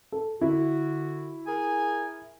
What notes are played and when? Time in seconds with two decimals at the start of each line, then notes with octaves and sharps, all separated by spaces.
0.12 A4
0.41 D3 E4 F#4
1.47 G#4 A#4 G#5